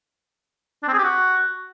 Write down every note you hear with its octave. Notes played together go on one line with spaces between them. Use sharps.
D4
C4
G#4
G4
F#4